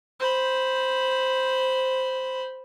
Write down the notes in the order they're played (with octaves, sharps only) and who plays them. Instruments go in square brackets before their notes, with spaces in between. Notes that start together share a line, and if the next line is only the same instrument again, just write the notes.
[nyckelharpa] C5 B5